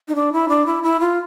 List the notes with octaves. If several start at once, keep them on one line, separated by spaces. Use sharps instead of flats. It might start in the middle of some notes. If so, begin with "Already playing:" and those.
D#4
D4
E4
D4
E4
E4
F4